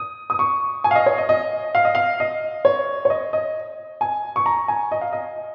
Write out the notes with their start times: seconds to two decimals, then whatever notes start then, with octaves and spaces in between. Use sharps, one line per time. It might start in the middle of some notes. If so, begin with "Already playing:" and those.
Already playing: D#6
0.30 D#6
0.39 C#6
0.84 G#5
0.91 F5
0.95 D#5
1.06 C#5
1.18 D#5
1.29 D#5
1.75 F5
1.85 D#5
1.95 F5
2.20 D#5
2.65 C#5
3.05 C#5
3.10 D#5
3.33 D#5
4.01 G#5
4.36 C#6
4.46 A#5
4.68 G#5
4.92 D#5
5.01 F5
5.13 D#5